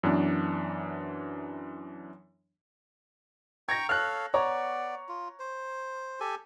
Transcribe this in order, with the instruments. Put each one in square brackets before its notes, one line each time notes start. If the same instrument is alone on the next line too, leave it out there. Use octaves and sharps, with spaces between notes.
[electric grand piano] F#2 E3 B3 D4
[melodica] G5 A#5 C#6 [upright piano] G#6 A#6
[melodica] A4 C#5 F5 [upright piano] F6 F#6
[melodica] B3 D5 [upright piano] C#5 A#5 C#6
[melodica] F4
C5
G4 A4 G#5